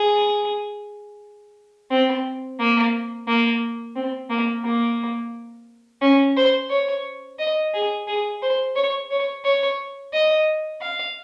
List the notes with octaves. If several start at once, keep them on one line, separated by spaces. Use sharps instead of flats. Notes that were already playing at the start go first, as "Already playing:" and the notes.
Already playing: G#4
C4
A#3
A#3
C4
A#3
A#3
C#4
C5
C#5
D#5
G#4
G#4
C5
C#5
C#5
C#5
D#5
F5